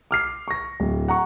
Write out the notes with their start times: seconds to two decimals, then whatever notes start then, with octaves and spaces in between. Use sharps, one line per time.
0.11 D6 F6 C7
0.48 C#6 A#6
0.80 D1
1.08 F#5 A#5 C#6